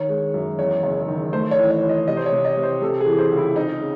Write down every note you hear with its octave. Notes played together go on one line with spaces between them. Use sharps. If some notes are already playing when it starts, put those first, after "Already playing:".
Already playing: D#3 C#5
G#3
F#2
E2 C#5
F#1
D#3
A3 C5
C#5
E3
C#5
E3
D#5
C3 D#5
C5
C#5
C3
D#5
C3
C5
C3 A4
G#4
E3
C5
C#2
E4
C4 D#4
C#3